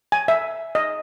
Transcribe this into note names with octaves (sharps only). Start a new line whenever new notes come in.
G#5
E5
D#5